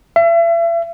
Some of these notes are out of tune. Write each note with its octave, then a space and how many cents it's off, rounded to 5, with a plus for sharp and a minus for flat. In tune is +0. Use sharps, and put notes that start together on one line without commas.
E5 +40